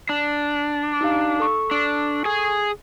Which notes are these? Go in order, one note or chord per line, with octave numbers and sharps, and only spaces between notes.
D4
D#4 G4 F5
A4 C#6
D4
G#4 G#5